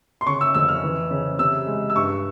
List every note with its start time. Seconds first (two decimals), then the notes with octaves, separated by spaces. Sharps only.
0.21 C6
0.26 C#3 C#6
0.41 E6
0.54 F2 E6
0.68 F6
0.84 E3
1.11 C#3
1.39 C3 E6
1.67 G#3
1.90 E6
1.96 G2 C#6